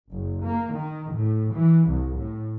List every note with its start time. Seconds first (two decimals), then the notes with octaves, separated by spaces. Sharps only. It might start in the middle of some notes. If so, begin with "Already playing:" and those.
0.12 F#1
0.44 A#3
0.75 D#3
1.13 A2
1.54 E3
1.89 C2
2.18 A2